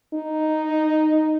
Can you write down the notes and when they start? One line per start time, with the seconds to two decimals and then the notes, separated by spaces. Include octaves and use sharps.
0.14 D#4